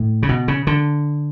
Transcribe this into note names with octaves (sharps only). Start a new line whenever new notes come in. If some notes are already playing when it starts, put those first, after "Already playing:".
Already playing: A2
C#3
B2
C#3
D3